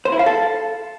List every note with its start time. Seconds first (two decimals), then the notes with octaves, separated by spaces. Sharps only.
0.05 C5
0.12 E4
0.19 F5
0.26 A4